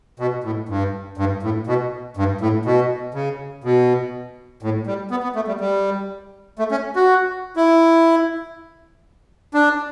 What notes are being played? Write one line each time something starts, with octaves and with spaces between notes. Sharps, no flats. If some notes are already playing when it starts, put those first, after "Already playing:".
B2
A2
G2
G2
A2
B2
G2
A2
B2
C#3
B2
A2
G3
B3
B3
A3
G3
G3
A3
C#4
F#4
E4
D4